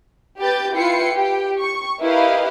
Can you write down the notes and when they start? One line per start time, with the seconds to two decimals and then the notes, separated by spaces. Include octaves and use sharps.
0.39 G4 B4 G6 A6
0.73 E4 F4 B4 G5 C7 C#7
1.13 G4 G5
1.60 C#6
2.01 E4 G4 A#4 B4 D#5 F5